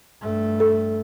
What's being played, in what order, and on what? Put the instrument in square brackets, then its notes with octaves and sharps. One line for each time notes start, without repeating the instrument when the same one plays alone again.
[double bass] G2 A3
[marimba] A4